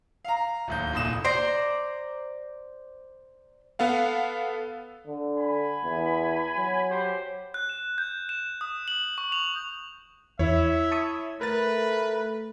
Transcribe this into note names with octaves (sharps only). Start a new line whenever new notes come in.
F5 A#5
D1 D#2 G6
F1 C2 A#2 D#6 E7
C5 D5 A#5
B3 A4 F5 F#5
D3
G#5 B5
E2
F#3
G4 C5
F#6
E7
G6
E7
D#6
F#7
C#6
F7
E2 E4 C#5 E5
A5 C#6 D#6
A3 A#4 B4 A6